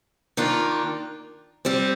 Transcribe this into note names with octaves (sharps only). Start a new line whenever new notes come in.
D#3 A#3 D4 F4
G3 C4 G4